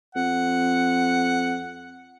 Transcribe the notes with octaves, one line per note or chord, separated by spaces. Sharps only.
F2 F#5